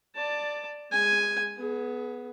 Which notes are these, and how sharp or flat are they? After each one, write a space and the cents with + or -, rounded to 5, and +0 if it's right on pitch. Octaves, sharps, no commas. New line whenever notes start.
D5 +5 A5 +15
G#3 -25 G#5 +0
B3 +0 G#4 +30